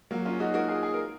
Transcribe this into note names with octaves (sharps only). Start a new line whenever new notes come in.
F#3 A#3
C#4 F4
D#4 F#4
F#4 A#4
F4 G#4
G#4
A#4